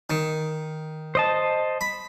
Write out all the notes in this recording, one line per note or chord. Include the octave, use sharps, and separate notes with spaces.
D#3
C5 D#5 A5
B5